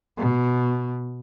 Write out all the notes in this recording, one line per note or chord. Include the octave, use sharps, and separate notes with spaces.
B2